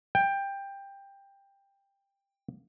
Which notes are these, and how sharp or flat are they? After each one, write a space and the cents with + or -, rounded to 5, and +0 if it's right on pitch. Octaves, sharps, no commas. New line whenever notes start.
G5 +15